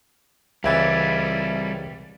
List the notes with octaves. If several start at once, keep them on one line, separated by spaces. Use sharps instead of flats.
C#2 E3 G3 C4 E5 G#6 A6